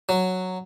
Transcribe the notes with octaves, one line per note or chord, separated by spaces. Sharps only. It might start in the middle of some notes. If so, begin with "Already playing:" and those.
F#3